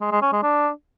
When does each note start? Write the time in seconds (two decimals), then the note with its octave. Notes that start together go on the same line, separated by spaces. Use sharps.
0.01 G#3
0.11 G#3
0.22 C#4
0.32 G#3
0.43 D4